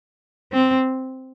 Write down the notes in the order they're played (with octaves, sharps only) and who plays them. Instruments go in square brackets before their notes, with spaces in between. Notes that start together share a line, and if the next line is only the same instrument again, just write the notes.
[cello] C4